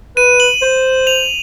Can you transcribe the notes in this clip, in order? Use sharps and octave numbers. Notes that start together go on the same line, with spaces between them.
B4 D#7
F#7
C5
F7